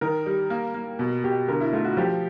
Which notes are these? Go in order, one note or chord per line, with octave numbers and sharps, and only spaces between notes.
D#3 A#4
G3
A#3
A#3
B2
B2 G4
D3 A#4
E4
A3 F4
F#4
F3 G4